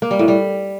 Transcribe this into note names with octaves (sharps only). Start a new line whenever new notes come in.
A#3
G3
A2
G3